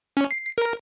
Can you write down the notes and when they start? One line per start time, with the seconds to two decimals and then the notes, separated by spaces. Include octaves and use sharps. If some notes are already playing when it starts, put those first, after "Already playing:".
0.17 C#4
0.31 C7
0.58 A#4